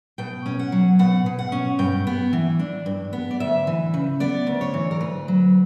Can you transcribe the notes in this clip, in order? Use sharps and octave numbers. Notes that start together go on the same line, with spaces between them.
B2 G5
C#4
F#5
F#3
B2 F#5
B2
F#5
C#4
G2 G5
B3
E3
D4
G2
B3
D5
D2 E5
E3
C#3
B3 D5
D2
C#5
E3
A#4
D2 B4
F#3